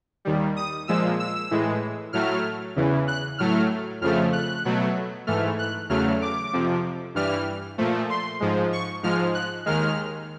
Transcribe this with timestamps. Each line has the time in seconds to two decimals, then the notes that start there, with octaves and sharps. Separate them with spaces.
0.25 D#2 D#3 G3
0.57 D#6
0.88 A#2 F3 G#3 E6
1.20 E6
1.51 A2 E3 G#3
2.13 A2 F#3 A3 F6
2.76 E2 C#3 E3
3.08 F#6
3.38 A2 F#3 A3 F6
4.01 F2 C#3 F3 A3 F6
4.33 F#6
4.65 B2 F#3 A3
5.27 G#2 E3 A3 F6
5.59 F#6
5.89 E2 C#3 F#3 A3 F6
6.22 D6
6.53 F2 C3 F3
7.15 G2 E3 G3 F6
7.78 A#2 F3 A3
8.10 C6
8.40 G#2 F3 G#3
8.73 C#6
9.03 G#2 F3 G#3 F6
9.35 F#6
9.66 D#2 D#3 G#3 F6